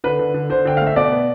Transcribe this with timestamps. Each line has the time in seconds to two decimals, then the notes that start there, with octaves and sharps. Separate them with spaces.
0.04 D3 B4
0.19 D3
0.34 D3
0.50 D3 C5
0.65 D3 G5
0.77 A3 F5
0.86 E5
0.96 B2 D5
1.12 B3